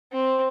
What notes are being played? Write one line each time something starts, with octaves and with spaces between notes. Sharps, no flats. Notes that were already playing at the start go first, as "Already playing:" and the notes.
C4